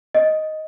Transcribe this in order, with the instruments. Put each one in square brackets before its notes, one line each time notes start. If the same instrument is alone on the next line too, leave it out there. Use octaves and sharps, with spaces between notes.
[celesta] D#5